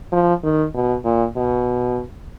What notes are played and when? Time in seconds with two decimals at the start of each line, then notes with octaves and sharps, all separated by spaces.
0.12 F3
0.43 D#3
0.74 B2
1.05 A#2
1.37 B2